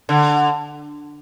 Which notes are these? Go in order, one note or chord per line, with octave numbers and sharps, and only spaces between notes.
D3